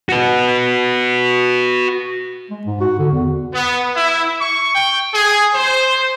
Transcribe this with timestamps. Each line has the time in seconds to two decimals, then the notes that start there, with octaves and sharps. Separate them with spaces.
0.09 F#4 B4
2.50 G#3
2.66 G#2
2.81 F#4
2.98 D3
3.12 E2
3.54 B3
3.95 E4
4.41 C#6
4.75 G5
5.14 G#4
5.55 C5